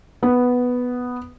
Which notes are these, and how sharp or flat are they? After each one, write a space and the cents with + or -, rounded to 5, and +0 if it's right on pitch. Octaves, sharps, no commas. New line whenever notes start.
B3 +0